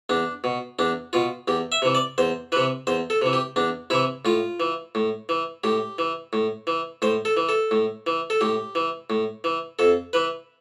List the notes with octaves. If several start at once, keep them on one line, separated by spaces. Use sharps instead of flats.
E2 D4
B2
E2 D4
B2 F4
E2 G4
E5
C3 E3
D5
E2 C5
C3 E3 B4
E2 C5
A4
C3 E3
G4
E2 D4
C3 E3 E4
A2 F4
E3
A2
E3
A2 G4
E3
A2
E3
A2 C5
A4
E3
A4
A2
E3
A4
A2 G4
E3
A2
E3
F2 A4
E3 B4